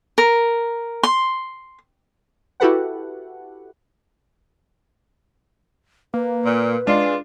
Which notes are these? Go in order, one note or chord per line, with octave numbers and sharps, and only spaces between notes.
A#4
C6
E4 F#4 G4 A4 B4 F#5
A#3 B4
A#2
G#3 D4 F4